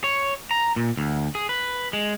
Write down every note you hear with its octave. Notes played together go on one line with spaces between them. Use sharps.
C#5
A#5
A#2
D2
G#4
B4
G#3